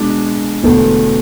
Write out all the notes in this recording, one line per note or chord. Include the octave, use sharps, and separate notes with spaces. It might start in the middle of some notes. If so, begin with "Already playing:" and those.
Already playing: B2 G#3 D4
E1 E2 D3 A3